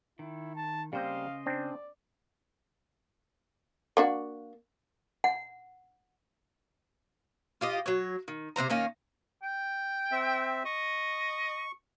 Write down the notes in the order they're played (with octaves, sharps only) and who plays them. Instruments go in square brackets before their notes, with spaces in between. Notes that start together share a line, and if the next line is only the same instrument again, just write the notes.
[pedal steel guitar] D#3 [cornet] E4
[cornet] A5
[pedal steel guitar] C#3 C5 D#5 [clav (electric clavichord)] G3 A#3 C4 [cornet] F5
[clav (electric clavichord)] C4 D4 [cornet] D5
[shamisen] A#3 D4 F#4
[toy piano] F#5
[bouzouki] F4 G4 D#5
F#3 C#5
D#3
C3 F#3 C5 A#5
D#3 A#3 C#4
[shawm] G5
[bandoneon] C4 E5
[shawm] D#5 [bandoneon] C#6